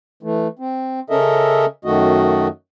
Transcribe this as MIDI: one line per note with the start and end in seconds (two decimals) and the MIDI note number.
0.23 0.47 52
0.23 0.47 57
0.59 1.00 60
1.10 1.66 49
1.10 1.66 61
1.10 1.66 69
1.10 1.66 70
1.10 1.66 75
1.10 1.66 76
1.85 2.48 42
1.85 2.48 51
1.85 2.48 57
1.85 2.48 66
1.85 2.48 75